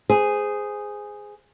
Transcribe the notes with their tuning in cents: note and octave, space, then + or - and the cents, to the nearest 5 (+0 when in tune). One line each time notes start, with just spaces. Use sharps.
G#4 -5 C5 -20